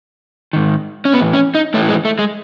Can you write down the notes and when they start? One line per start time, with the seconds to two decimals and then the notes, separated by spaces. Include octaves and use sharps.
0.53 G#2 D#3
1.05 C#4
1.14 A2 E3 B3
1.33 C#4
1.55 D#4
1.74 A2 E3 A3
1.89 G#3
2.05 A3
2.19 G#3